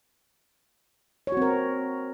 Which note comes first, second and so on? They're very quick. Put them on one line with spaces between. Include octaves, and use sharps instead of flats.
C#5 F#4 C4 A#4